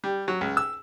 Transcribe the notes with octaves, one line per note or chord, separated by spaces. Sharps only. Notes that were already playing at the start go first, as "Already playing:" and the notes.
G3
F#3
C#2
E6